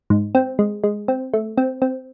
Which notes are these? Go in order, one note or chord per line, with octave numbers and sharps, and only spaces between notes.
G#2
C4
G#3
G#3
C4
A3
C4
C4